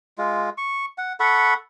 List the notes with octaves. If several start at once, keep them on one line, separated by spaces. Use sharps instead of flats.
G#3 F4
C#6
F#5
A4 F#5 B5 C#6